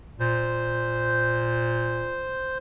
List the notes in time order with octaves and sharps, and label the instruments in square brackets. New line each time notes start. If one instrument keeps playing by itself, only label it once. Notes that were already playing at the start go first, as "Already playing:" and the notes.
[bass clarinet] A#2 [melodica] C5